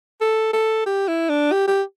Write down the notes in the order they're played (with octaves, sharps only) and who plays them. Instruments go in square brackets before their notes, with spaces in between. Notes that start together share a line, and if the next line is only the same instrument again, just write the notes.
[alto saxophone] A4
A4
G4
E4
D4
G4
G4